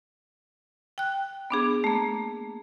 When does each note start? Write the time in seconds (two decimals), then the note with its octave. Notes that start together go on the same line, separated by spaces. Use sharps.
0.98 G5 F#6
1.50 B3 D4 G#4
1.84 A3 A#3